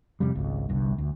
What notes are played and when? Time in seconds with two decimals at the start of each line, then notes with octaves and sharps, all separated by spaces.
0.20 F2 C3 G3
0.35 G#1 C#2
0.69 G1 C2 G2
0.98 D2